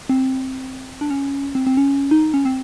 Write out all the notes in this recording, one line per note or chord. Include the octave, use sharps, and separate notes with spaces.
C4
D4
C#4
C4
C4
C#4
D#4
C#4
C4